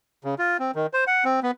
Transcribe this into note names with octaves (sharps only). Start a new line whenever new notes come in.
C#3
F4
C4
D#3
C5
F#5
C4
B3